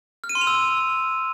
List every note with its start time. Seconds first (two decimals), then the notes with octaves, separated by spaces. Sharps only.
0.24 F6
0.29 D#7
0.35 C6
0.41 F7
0.47 E6